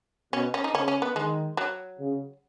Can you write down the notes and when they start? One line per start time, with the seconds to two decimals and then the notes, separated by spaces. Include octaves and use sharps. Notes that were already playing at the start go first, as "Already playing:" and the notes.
0.33 B2 C#4
0.54 C#4
0.64 D#4
0.75 C#3 C#4
0.88 C#4
1.02 B3
1.16 D#3 G#3
1.57 F#3
2.00 C#3